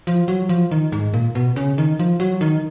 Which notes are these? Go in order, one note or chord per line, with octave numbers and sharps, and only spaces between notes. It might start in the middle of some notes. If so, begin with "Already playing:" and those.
F3
F#3
F3
D#3
G#2
A#2
B2
C#3
D#3
F3
F#3
D#3